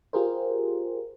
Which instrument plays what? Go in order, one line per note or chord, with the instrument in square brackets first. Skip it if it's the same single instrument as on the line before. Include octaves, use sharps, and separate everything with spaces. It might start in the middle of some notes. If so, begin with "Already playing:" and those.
[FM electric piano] F4 G4 G#4 A#4 C5